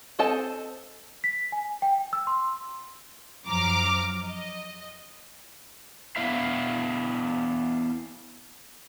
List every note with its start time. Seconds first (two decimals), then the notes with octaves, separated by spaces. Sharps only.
0.19 C4 A4 D#5 G#5 A5
1.24 B6
1.52 G#5
1.82 G5
2.13 E6
2.27 C6
3.46 F#2 F3 A#5 D6 F6
4.25 D#5
6.16 B3 D4 E4 E5 F5